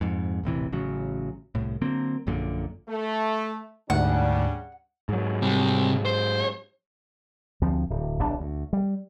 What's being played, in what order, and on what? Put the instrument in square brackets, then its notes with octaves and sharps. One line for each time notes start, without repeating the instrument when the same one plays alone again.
[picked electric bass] F2 G#2
D#1 A1 C3 E3
A1 C#3 F#3
C2 A2
D3 F#3 A#3 C4
A#1 F#2 A#2 D3
[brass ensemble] A3
[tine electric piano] D2 G#2 [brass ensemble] C#3 G3 D4 [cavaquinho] F#5
[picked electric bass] G#2 F#3
[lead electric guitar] C3 G3
C5
[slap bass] D2 F3 C4
D1
D1 B1 A#2 D4
D2
G3